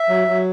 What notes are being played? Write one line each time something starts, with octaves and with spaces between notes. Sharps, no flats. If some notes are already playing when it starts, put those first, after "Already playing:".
Already playing: E5
F#3
F#3